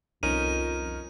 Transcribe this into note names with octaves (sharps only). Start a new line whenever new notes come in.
C2 F2 C#4 D#4 A#4 D#7